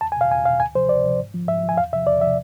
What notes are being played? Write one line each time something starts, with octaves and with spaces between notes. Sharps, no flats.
E2 A5
G#5
B2 F5
E2 G#5
B2 F5
D2 G#5
C3 F3 C5
D2 D5
C3 F3
G#2
F3
G#2 E5
F3
G#5
E2 F5
C3 F3 E5
E2 D5
C3 F3 E5